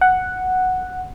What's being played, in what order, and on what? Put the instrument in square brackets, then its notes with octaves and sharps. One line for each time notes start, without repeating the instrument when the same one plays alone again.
[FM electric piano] F#5